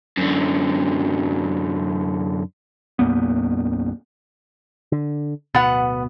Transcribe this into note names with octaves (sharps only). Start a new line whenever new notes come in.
F#2 D3
B1 F#2 A#3 B3
D3
D1 B2 B3 F#5